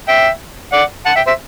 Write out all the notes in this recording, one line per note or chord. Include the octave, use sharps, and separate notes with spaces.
E5 G5
D5 F#5
F#5 A5
E5 G5
C5 E5